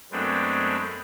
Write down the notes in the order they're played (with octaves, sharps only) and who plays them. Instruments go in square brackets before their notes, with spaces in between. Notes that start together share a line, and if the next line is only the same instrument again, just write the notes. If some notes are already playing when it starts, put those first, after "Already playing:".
[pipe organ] F#2 G#3 A3 B3 C4 D4